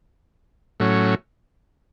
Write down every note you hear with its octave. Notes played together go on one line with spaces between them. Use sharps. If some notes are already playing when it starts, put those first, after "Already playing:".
A2 F#3 C#4